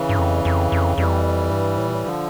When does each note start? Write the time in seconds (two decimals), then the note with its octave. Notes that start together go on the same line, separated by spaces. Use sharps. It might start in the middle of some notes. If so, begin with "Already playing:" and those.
Already playing: C#3 E3
0.09 G2
0.19 F2
0.45 F2
0.72 F2
0.98 F2 E3 G3
1.51 G2
1.78 A2
1.86 A#2
1.95 A2
2.04 D3 F3